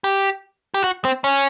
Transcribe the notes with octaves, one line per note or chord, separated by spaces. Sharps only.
G4
G4
F#4
C4
C#4